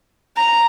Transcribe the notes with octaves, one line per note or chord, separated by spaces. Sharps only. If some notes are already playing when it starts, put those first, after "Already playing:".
A#5